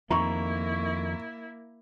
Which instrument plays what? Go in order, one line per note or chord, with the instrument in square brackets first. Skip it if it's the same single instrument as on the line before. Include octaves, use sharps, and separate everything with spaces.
[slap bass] F2 D#3 [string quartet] A#3 E4 [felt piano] A#5 C#6